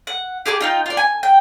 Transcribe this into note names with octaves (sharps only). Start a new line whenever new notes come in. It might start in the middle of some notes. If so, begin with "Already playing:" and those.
F#5
G4 G#4 A5 D6
D#4 F4 G5
F4 D5
G#5
G5